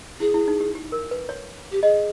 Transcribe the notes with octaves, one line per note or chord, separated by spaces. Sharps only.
E4 G#4
E4
D#4
G4
G4
A#4
B4
C#5
G4
G#4 D#5